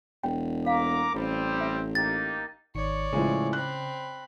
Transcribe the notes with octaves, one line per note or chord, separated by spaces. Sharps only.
E1 G5
A#3 F5 A#5 D6
A1 G3 C4
E5
A#3 D#4 G4 A6
G#1 D#3 C#5 D5 C#7
A2 C#3 F3 G#3
C4 B5 F#6